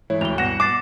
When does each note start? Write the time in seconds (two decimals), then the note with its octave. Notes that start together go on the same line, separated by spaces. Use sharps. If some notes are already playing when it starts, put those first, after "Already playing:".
0.10 G#2 E3 A3 E4 C#5
0.21 D1 F7 G7
0.38 G2 B2 F#5 A#6 E7
0.60 D6 A6 C7 E7